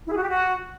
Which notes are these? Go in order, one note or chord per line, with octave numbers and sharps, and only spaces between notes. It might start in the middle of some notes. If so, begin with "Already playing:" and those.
E4
G#4
F#4
G4
F#4